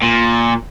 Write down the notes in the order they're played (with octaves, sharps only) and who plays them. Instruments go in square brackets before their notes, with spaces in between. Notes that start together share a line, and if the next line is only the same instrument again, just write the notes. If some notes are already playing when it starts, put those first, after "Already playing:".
[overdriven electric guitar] A#2